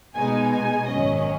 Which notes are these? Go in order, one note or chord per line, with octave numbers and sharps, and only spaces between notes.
B2 G#3 D#4 G#5
G#5
G#1 F#2 D#3 F#3 C#4 D#5